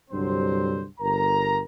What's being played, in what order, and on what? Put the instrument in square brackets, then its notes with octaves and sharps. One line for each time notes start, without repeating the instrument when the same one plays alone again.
[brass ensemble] C2 G2 D3 F#3 C4 C5
G1 A#4 A#5